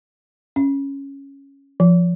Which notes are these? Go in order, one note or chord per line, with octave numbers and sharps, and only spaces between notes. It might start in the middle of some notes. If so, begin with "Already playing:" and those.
C#4
F3